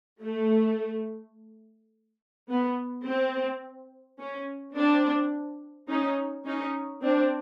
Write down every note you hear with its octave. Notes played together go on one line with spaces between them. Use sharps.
A3
B3
C4
C#4
C4 D4
C#4 D#4
C#4 D#4
C4 D4